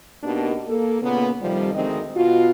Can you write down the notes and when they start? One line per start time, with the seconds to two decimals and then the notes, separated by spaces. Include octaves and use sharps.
0.23 B2 A#3 D4 D#4 G4 A#4
0.67 A#3 A4
1.02 A#2 C#3 A#3 B3
1.42 F2 C3 D#3 F3 G3
1.74 D2 D#3 G#3 C4 D#5
2.16 B2 F4 F#4